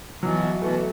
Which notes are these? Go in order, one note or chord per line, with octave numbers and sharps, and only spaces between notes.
B2 E3 F#3
F#4
B2 E3 A3